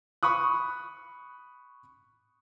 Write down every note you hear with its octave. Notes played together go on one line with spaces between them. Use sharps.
B5 C#6 D#6 F#6